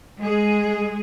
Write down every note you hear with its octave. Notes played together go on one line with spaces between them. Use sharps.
G#3 G#4